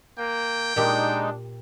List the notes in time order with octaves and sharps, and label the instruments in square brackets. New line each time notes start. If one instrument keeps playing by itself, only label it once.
[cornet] A#3 [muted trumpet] G5
[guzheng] A#2 G4 [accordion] G#3 D#4 [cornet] D4